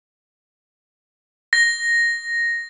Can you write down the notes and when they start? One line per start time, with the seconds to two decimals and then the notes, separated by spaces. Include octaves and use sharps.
1.53 A#6